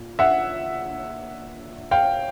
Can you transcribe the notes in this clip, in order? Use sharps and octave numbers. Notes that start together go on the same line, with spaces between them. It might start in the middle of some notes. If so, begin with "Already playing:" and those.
Already playing: A#2
E5 F#5
F5 G5